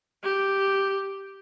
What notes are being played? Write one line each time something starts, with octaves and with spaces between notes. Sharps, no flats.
G4